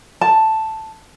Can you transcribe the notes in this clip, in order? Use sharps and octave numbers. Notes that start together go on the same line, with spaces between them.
A5